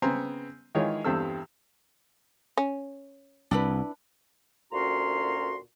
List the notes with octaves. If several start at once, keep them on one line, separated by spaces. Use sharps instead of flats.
C#3 B3 C4 G#5 A#5 C6
D#3 E3 G#3 F4 G#4 C#5
E2 G2 G3 C4 A4 E6
C#4
C2 D4 E4 B4
D2 A#2 C#4 F#4 A#5 C6